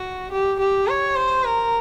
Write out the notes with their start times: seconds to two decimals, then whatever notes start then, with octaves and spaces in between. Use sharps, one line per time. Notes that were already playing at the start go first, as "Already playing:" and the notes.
Already playing: F#4
0.32 G4
0.60 G4
0.88 C#5
1.16 C5
1.45 A#4